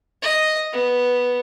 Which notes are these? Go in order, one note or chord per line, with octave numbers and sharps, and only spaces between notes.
D#5
B3